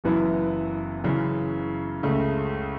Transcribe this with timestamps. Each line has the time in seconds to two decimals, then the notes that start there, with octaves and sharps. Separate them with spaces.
0.04 F#1 F#2 E3 B3 E4
1.04 F#2 C#3 E3
2.03 C#2 C#3 A3